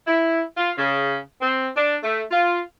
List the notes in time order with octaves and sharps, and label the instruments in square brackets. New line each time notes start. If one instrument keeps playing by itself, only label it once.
[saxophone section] E4
F4
C#3
C4
D4
A3
F4